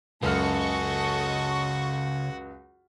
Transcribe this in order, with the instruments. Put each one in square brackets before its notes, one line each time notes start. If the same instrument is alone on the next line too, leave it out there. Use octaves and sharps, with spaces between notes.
[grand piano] C#2 F#2 F6 [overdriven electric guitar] C#3 [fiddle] F#4 [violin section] A4 D#5 C#6